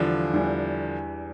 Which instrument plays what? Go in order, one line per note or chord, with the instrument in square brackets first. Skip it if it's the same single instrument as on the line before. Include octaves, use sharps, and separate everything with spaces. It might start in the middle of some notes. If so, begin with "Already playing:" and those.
Already playing: [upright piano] E2 E3 G3 D4 [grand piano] D3 F3
[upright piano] E2 E3 G3 D4